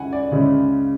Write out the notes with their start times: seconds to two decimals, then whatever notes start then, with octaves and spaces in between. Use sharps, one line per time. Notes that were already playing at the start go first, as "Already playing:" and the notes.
Already playing: C#2 C#3 G#3 C#4 E4 F#5 G#5
0.13 D5
0.31 C#2 C#3 G#3 C#4 E4